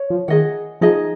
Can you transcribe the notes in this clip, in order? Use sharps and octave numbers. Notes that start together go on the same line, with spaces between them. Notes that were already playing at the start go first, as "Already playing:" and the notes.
Already playing: C#5
F3
D#3 G#4 D#5 F#5
F3 D#4 G#4 D#5